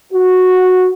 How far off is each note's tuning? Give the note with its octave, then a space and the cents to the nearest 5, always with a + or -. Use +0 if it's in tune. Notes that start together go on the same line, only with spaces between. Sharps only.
F#4 -10